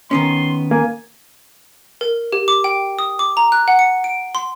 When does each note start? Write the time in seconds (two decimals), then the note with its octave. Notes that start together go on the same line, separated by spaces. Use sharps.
0.11 D#3 B3 C#4 C6
0.71 A#3 G#5
2.01 A#4
2.32 G4
2.48 D6
2.64 G5
2.99 D#6
3.19 D6
3.37 A#5
3.52 F#6
3.68 F#5
3.79 C#7
4.04 D7
4.35 C6